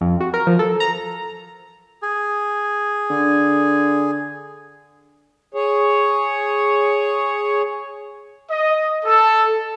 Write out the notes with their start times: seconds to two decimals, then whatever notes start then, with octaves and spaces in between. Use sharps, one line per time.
0.01 F2
0.20 F#4
0.34 A#4
0.47 F3
0.59 A4
0.80 A#5
2.02 G#4
3.10 D3
5.54 G#4 C#5
8.50 D#5
9.05 A4